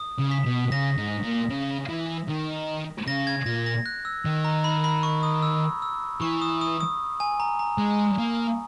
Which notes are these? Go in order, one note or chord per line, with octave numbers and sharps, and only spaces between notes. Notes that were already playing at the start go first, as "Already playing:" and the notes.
Already playing: D#6
C#3
B6
B2
C#3 A#6
G#2
A#2
C#3
E3
D#3
C#3 A#6
G#6
A#2 A#6
A#6
F#6
E6
D#3
A#5
B5
B5
C#6
D#6
E6
E6
E3 C#6
D#6
D#6
D#6
G#5
A#5
A#5
G#3
A#3